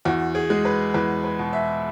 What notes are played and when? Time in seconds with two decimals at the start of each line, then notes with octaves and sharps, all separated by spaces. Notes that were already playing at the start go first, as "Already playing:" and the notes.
0.05 E2 F#4
0.35 G#4
0.50 G#3
0.65 B4
0.94 E2 B4
1.24 B4
1.39 B2
1.53 E5